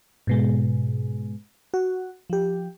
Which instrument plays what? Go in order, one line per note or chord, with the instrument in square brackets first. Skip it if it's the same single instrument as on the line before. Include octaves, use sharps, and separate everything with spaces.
[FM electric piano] G#2 B2 G#3
F#4
F3 G4